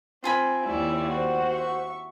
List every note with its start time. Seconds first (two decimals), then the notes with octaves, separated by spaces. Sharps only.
0.24 C4 F4 G#5 B5
0.66 D#2 G3 E4 C#5 D5
1.09 F#4 C5 F#5
1.50 E5 C#6